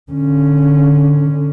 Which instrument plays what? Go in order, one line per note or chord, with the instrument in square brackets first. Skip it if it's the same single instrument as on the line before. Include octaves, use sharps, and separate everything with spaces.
[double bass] D3 C#4